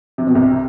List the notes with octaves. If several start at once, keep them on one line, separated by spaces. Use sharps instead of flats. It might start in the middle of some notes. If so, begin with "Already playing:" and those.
C3
B2
C2 C3
C3